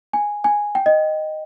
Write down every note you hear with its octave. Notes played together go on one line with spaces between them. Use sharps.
G#5
G#5
G5
D#5